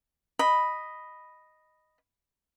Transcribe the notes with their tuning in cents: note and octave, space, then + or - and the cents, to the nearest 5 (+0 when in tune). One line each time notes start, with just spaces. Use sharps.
D#5 +0 B5 +0